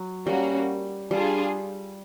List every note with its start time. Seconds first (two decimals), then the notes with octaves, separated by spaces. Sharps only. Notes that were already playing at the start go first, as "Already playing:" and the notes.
Already playing: F#3
0.26 G3 A#3 C#4 F#4
1.11 G3 D4 F4 G#4